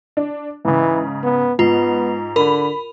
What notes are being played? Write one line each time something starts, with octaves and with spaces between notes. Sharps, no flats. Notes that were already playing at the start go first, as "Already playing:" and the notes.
D4
G#2 C#3 E3
B3
G#2 B3 F4
D3 A#4 B5